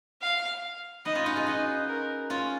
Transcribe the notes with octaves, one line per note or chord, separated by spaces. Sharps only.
F5
B3 D#4 D#5
C#4 F4
D#4 F#4
F4 G#4
D#4 F#4 D#5
A#4
C#4 F4